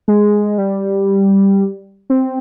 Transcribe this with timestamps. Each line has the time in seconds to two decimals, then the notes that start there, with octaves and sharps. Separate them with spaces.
0.08 G#3
0.58 G3
2.10 C4